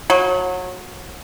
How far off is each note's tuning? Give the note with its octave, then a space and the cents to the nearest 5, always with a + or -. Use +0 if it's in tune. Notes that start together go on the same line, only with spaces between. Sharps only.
F#3 -25